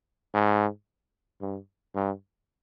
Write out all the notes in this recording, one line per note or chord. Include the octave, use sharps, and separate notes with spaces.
G#2
G2
G2